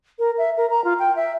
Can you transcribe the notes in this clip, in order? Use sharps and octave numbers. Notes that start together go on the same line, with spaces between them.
A#4
E5
A#4
A#5
F4
G5
E5